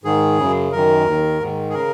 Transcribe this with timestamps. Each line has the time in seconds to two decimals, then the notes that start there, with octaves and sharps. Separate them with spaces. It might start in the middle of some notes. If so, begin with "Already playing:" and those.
0.04 G#2 D#3 G#4
0.38 F#2 C#3
0.72 F#2 D#3 A#4
1.06 D#2 D#3
1.40 G#2 D#3
1.70 G#4
1.74 C#3 A#4